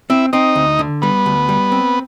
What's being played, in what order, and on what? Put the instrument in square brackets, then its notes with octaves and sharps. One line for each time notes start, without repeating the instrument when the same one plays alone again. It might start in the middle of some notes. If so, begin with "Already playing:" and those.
[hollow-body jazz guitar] C4 [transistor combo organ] E4
[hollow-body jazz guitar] C4 [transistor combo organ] D#4
[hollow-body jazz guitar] D2
D3
[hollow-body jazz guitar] G3 [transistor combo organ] B3
[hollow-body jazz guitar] D2
G3
C4